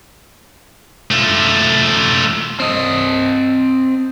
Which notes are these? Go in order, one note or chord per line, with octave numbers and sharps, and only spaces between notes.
A3 F4
C4 D#5